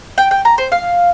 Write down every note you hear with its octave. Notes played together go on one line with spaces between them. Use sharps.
G5
G5
A#5
C5
F5